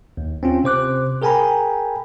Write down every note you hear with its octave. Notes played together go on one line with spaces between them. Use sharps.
D#2
C4 C#4 F4
C3 C5 D6 F#6
G#4 A#4 G5 G#5 A#5 B5